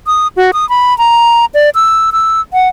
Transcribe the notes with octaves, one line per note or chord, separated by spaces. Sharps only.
D#6
F#4
D#6
B5
A#5
D5
E6
E6
F#5